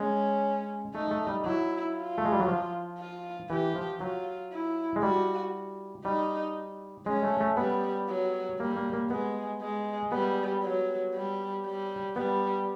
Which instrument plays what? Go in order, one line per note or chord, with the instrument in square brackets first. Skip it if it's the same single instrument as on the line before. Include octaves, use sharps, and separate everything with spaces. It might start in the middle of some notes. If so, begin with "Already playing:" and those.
Already playing: [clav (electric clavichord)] G#3 [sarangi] C#4
[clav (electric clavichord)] A3 [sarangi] D#4
[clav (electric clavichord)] A3
G3
[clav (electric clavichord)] F#3 [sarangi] E4
[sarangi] F4
[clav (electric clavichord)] A3
G#3
G3
F#3
F3
[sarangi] F4
[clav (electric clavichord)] E3 [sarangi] G4
[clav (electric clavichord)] F3
[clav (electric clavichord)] F#3 [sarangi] F4
[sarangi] E4
[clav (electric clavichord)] G#3
[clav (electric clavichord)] G3 [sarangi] F#4
[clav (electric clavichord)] G3 [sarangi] D#4
[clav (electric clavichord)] G#3 [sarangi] C#4
[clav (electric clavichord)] A3
A3
[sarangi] G3 [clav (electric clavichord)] B3
[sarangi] F#3
[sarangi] G3 [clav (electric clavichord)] A#3
[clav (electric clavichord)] A#3
A#3
[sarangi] G#3 [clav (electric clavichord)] B3
[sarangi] G#3
[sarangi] G3 [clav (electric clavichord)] B3
[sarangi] F#3
G3
G3
[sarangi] G3 [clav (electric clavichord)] B3